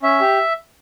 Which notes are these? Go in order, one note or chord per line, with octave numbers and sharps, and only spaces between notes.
C#4 E5
G4